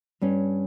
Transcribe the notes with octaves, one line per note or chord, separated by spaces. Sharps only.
G2 G3 C#4